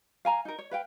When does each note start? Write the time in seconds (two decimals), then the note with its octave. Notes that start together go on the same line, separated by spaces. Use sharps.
0.25 F5 G#5 A#5
0.45 D#4 A#4
0.59 C#5
0.71 B4 F5 G5